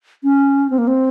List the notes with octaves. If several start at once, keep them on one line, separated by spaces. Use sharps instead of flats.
C#4
C4
A#3
C4